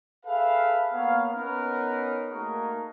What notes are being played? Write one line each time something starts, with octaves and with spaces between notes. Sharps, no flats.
G#4 A4 B4 E5 F5
A#3 B3 C#5 F5
B3 C#4 D#4 A#4 B4
A3 A#3 D#4 F#4 G#4 A#4